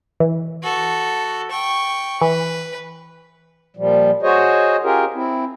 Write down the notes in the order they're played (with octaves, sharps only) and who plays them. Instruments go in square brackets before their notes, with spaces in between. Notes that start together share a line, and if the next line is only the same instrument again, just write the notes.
[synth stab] E3
[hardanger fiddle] F#4 A4
G5 C#6
[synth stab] E3 [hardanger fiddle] B4
[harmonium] A#2 F3 G3
F#4 G#4 C5 C#5 D#5
C#4 F4 G4 G#4 A#4
C4 E4